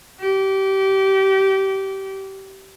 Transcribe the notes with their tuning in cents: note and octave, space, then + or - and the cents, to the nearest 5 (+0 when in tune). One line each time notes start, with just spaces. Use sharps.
G4 -25